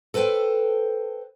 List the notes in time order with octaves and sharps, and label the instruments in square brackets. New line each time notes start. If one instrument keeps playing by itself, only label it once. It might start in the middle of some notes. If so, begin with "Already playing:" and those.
[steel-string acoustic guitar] A4 B4 C5 F#5 G5